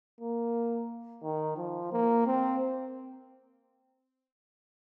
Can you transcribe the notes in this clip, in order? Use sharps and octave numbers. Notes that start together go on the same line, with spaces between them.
A#3
D#3
F3
A#3
C4